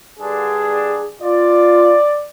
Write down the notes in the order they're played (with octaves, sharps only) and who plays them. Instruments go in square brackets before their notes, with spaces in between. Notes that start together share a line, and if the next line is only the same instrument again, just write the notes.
[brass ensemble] G2 D3 D4 [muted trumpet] G#4
[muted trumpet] F4 [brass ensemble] D5